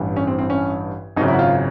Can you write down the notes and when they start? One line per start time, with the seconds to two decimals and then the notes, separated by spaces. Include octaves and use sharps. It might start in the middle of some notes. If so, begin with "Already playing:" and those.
Already playing: A1 G2 E3
0.16 C#4
0.27 C4
0.39 C4
0.50 C#4
1.17 G#1 F#2 C#3 D#4
1.28 E4
1.34 F#4
1.39 F4